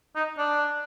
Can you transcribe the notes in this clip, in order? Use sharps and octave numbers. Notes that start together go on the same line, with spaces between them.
D#4
D4